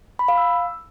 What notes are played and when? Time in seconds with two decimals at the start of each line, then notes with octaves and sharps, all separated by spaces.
0.19 B5
0.28 F5
0.38 E6